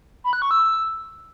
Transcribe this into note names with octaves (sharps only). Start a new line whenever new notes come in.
B5
F#6
C#6
E6